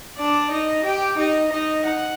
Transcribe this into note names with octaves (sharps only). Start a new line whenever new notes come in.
D4 D5
D#4 D#5
G4 G5
D#4 D#5
D#4 D#5
F#5